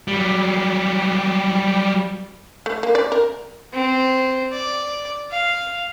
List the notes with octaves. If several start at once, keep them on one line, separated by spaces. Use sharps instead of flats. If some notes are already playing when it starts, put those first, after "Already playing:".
F#3 G3
A3
A#3
D5
A#4
C4
D5
F5